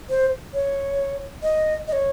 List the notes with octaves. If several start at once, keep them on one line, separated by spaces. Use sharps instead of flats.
C5
C#5
D#5
D#5
C#5